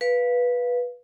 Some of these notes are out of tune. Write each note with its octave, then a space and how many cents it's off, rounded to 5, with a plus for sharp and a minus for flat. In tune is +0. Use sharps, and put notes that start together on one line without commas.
B4 -10 F5 +0